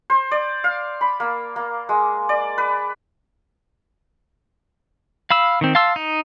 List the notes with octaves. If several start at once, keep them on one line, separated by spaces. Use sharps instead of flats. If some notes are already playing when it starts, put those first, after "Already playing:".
C5
D5
F5
B5
A#3
A#3
G#3
D5
B4
F5 B5 E6
D#3 C4
F5 A5 C6 E6
D#4